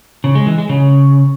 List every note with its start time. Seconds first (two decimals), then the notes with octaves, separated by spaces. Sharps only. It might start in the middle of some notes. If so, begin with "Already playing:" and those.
0.24 C#3
0.35 G#3
0.47 E3
0.58 G#3
0.69 C#3